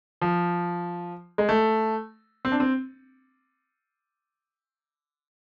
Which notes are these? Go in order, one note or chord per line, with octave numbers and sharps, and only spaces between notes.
F3
G#3
A3
C4
D4
C4